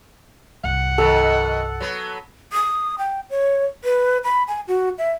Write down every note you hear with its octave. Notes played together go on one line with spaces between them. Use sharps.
C2 G2 F#5
B2 D#3 A4
F#3 B3
D#6
G5
C#5
B4
B5
G#5
F#4
E5